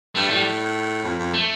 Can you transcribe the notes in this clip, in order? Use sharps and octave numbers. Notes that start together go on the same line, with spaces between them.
G2 A3
A2 G3
F2
F2
A3